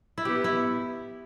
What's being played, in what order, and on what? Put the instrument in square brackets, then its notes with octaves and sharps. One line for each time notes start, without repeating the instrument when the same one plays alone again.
[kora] E4
[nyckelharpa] B3 [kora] G4
[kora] E4